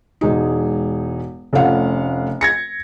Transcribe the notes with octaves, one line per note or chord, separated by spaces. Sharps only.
E1 G#3 D#4
F1 A3 C#4 F4 F5 F#5
G#6 A#6 C#7